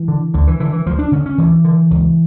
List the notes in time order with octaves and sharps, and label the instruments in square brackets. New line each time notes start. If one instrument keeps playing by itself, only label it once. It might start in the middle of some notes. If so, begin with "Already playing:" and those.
Already playing: [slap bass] E3
D3
D2 D3
E3
D3 E3
E3
D2 F3
D4
D3 C#4
C#4
D2 E3
D3
C#2